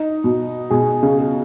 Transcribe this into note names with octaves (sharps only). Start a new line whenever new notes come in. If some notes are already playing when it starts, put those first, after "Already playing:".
Already playing: D#4
B2
B2 G#4
C#3
G#4